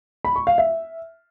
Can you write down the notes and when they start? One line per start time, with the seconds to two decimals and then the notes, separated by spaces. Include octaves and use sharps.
0.25 B5
0.36 C#6
0.47 F5
0.58 E5